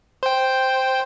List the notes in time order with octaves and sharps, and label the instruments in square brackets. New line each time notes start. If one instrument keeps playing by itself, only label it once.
[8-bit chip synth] C5 G5